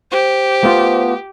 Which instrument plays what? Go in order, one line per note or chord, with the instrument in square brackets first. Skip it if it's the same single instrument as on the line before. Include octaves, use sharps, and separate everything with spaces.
[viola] G4 [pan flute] C5
[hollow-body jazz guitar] A3 B3 F4